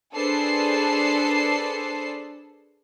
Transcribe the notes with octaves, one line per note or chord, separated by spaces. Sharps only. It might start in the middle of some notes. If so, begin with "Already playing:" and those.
D4 G#4 A4 B4 C5 C7